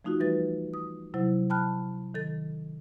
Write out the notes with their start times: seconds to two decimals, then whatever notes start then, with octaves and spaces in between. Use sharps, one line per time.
0.05 F3 A3 D#4 F4 F#4
0.20 E3 G3 B4 A6
0.74 D#6
1.14 C3 F#3 E4 C5
1.50 G5 A5 B5 F6 F#6
2.14 D#3 A4 A6